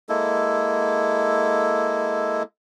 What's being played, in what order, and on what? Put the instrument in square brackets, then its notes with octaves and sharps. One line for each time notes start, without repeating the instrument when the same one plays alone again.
[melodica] G#3 A#3 E4 A4